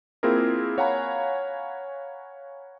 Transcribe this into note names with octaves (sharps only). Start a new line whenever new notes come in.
A#3 C4 E4 F4 G#4 A#4
C#5 F5 F#5 G#5 A#5 B5